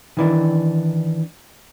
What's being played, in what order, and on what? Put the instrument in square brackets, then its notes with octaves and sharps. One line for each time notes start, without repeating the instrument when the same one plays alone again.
[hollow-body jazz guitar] D#3 E3 D4